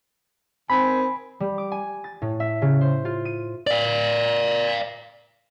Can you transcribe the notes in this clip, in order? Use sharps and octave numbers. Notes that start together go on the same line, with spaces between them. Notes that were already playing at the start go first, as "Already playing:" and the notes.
D#3 C4 G#5 B5
G3
D6
G#5
A6
A2
E5
C#3
C5
F4
D#7
D5 F5